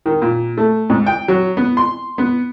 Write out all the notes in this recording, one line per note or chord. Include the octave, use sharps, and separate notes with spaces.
D#3
A#2
A3
G#2
G5
F#3
B3
C6
B3